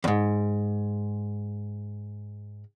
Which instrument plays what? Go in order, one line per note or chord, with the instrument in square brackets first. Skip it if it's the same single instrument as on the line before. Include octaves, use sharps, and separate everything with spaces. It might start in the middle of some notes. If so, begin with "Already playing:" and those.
[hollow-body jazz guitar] E2 G#2